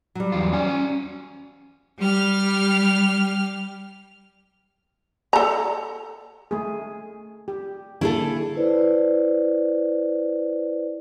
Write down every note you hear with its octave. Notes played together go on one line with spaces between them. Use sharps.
F#3 G3
E2 F4
C#4 D5 G#5
G3 G4 F6
A4 A#5
A3 G#4
G4
D3 A#3 E4 G#4 A4
E4 B4 C5 D5